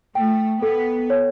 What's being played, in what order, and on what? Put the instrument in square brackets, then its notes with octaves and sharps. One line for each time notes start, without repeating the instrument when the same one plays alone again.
[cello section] A3 [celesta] G5
[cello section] B3 [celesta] A4
[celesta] C#5